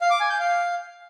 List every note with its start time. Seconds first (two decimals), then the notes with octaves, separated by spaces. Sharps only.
0.01 F5
0.10 D6
0.20 G#5
0.30 G6
0.40 F5